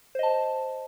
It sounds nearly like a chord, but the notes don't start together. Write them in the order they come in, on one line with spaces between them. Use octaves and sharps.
C5 D#5 A5